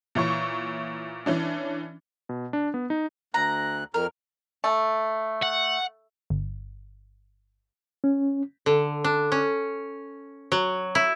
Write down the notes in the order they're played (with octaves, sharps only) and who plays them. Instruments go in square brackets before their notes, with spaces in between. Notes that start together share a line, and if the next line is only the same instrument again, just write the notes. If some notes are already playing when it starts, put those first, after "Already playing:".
[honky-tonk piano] A#2 E3 C#5 C#6
E3 C#4 D4
[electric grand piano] B2
D4
B3
D#4
[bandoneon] D2 F#6 [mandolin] A#5
[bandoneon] F2 F6 [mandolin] A#4
[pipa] A3
[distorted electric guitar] F#5
[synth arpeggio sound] G1
[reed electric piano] C#4
[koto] D3
D4
C#4
F#3
E4